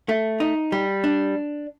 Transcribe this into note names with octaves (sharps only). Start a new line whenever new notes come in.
A3
D#4
G3
D4